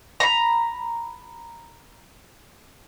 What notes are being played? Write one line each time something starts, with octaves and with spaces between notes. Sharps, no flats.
A#5 B5